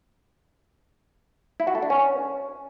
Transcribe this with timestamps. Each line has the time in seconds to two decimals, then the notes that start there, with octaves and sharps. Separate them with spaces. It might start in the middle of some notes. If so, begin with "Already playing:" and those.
1.60 E4
1.67 F#4
1.75 A4
1.83 D4
1.90 C#4